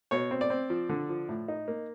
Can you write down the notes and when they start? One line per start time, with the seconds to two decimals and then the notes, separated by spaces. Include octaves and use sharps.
0.11 B2 C#5
0.31 C4
0.41 D5
0.50 C4
0.70 F3
0.89 D3
1.09 F3
1.29 A2
1.48 D#4
1.68 A#3